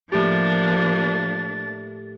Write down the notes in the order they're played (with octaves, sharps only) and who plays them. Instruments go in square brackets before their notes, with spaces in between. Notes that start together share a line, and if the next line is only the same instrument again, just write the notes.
[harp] A2 G4 [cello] F3 [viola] A#3 D4 [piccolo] A6